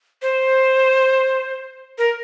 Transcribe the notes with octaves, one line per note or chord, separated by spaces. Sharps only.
C5
A#4